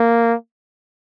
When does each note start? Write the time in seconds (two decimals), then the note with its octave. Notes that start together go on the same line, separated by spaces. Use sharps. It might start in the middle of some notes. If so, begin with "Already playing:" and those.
Already playing: A#3